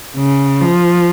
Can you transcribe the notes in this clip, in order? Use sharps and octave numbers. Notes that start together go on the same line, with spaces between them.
C#3
F3